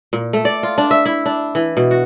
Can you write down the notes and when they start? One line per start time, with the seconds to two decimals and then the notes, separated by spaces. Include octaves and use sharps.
0.13 A#2
0.33 A3
0.45 D5
0.63 F4
0.78 D4
0.91 E5
1.06 E4
1.26 D4
1.55 E3
1.77 B2
1.91 F#4